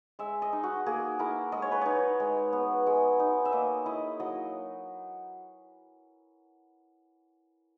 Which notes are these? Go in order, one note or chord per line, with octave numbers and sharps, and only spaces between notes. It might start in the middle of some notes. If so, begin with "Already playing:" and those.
G#3 E5
D#5
D#4
F#4
A#3 G#4
E4 A#4
G#3 D#5
C#5
B4
D#4 C#5
G#3
B3
G#3
D#4
E5
A#3 D#5
E4 D#5
F#3 D#5